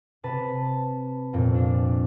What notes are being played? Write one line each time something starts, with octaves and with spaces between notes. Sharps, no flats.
C3 B4 A5
F2 A#2 C4
D4